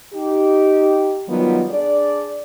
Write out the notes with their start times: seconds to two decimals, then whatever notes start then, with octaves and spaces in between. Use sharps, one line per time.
0.14 D#4 G4
1.27 D#3 F#3 G3 B3 F4
1.70 D4 G#4 D5